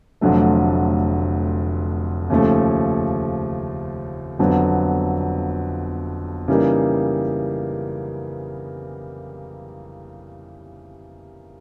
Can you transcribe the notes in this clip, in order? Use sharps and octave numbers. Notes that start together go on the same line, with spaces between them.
F1 F2 D3 F#3 A3
D#2 C#3 F3 A3
G1 F2 D3 F#3 B3
C#3 E3 G3 A#3 D#4